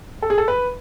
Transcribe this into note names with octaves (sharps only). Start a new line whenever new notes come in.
A4
G#4
A4
B4